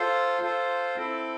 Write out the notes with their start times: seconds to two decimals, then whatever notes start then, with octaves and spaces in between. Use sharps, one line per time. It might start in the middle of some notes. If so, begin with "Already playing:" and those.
Already playing: F4 A4 C5
0.42 F4 A4 C5
0.95 C4 E4 A4